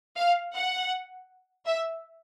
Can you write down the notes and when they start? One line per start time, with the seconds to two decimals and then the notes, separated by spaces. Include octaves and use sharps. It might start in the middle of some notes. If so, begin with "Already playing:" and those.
0.17 F5
0.54 F#5
1.66 E5